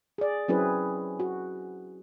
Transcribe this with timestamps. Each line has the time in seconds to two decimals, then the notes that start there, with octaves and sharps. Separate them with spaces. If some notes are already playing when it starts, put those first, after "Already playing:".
0.18 G#4 D5
0.48 F#3 C4 C#4 E4 G#4 B4
1.20 F#4